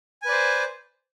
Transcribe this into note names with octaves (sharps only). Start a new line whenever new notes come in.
B4 C5 D5 G#5